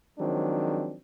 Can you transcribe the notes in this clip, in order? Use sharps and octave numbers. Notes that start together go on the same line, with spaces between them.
D#3 F3 F#3 G#3 C4 D4